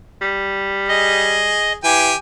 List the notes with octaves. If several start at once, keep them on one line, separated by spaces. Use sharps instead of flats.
G3
G#4 D#5
E3 G4 G5 G#5